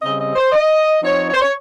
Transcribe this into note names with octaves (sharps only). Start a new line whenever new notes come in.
C#3 G3 C4 D#5
D#5
C5
D#5
F3 C4 D#4 C#5
C#5
C5
C#5